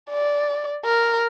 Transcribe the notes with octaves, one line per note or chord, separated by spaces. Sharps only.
D5
A#4